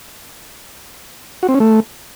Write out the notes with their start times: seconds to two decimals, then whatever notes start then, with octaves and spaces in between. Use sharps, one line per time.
1.43 F#4
1.48 C4
1.54 C#4
1.60 A3